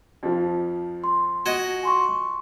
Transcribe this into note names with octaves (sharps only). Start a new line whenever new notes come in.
F2 F3
C6
F#4 D#5 G#6
G#5 C6 C#6